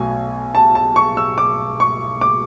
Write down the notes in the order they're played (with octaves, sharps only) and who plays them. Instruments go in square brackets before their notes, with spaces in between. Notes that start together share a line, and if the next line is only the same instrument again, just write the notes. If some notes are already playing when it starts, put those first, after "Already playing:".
Already playing: [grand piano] B1 B2 F#3 A3 G#5
A5
A5
C#6
E6
D6
C#6
D6